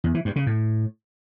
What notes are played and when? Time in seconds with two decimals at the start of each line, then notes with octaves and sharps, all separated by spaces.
0.04 E2
0.14 E3
0.25 G2
0.36 C#3
0.47 A2